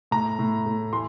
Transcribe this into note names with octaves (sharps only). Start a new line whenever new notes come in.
A2 A#5
A2
A2
E3 C6